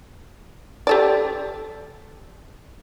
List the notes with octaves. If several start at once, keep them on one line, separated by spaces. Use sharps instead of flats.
G4 A4 D5